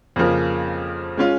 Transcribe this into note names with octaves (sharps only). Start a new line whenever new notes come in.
F2 C#3 F3 A#3
G#3 C#4 F4